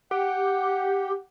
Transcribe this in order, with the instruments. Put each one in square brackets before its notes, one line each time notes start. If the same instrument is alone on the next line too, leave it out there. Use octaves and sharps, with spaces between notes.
[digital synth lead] G4 [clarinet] F#5